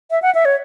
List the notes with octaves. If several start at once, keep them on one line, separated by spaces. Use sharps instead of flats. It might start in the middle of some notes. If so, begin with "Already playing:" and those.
E5
F#5
E5
C#5